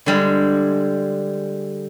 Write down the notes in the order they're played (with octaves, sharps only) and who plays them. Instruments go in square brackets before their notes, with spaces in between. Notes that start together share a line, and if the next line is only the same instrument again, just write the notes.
[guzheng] D3 G3 G#3